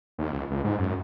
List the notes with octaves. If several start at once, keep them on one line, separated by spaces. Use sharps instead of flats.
D#2
C#2
C#2
G#2
F#2